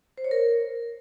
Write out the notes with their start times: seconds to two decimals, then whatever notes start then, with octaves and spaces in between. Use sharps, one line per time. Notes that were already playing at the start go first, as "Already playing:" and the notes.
0.18 C5
0.24 C#5
0.31 A#4